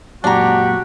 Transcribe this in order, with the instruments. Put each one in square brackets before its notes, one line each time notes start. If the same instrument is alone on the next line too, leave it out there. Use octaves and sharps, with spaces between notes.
[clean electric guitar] F#2 A#2 [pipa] D4 A#5 [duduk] F#4 [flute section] G4 F#5